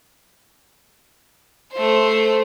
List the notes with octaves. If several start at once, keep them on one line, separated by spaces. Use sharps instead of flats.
A3 C5